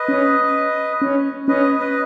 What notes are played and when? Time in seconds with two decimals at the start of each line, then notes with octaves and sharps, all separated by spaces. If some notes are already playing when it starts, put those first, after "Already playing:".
Already playing: B4 D#5
0.08 C#4
1.02 C#4
1.48 C#4 B4 D#5
1.80 B4 D#5